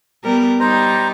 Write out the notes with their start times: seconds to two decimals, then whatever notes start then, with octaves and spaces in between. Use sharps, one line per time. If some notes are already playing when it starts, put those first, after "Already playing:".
0.24 G3 B3 A#4
0.60 G3 D#4 C5 A#5